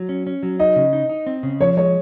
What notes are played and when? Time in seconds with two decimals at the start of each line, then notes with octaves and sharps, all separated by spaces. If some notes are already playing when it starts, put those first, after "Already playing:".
Already playing: F#3
0.09 C#4
0.27 C#4
0.43 F#3
0.59 D#4 D#5
0.76 C#3
0.93 D#4
1.09 D#4
1.27 C4
1.43 C#3
1.61 F3 C#5
1.77 G#3 C#5